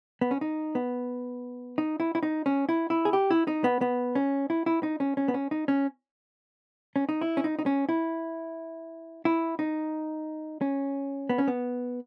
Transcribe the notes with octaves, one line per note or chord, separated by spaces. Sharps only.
B3
C#4
D#4
B3
D#4
E4
E4
D#4
C#4
E4
E4
G#4
G4
E4
D#4
B3
B3
C#4
E4
E4
D#4
C#4
C#4
B3
C#4
D#4
C#4
C#4
D#4
E4
C#4
D#4
D#4
C#4
E4
E4
D#4
C#4
B3
C#4
B3